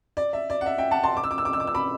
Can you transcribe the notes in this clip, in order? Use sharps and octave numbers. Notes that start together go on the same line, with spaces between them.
D5
E5
D5
F#5
E5
E5 G5
F#5 A5
A5 C6
D6
E6
D6
E6
D6
E6
D6
E6
B5 D6